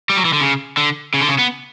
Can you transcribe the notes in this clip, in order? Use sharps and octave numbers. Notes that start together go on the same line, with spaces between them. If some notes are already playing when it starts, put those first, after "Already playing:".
G3
F#3
E3
D3
C#3
D3
C#3
D3
C#3
B3